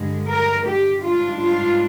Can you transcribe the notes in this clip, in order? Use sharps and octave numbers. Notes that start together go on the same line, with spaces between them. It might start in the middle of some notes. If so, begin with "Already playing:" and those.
Already playing: G2 D3 G#3
A#4
G4
G#2 G3 D4 F4
F4